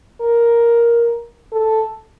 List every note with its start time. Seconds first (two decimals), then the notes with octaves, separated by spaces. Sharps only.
0.21 A#4
1.52 A4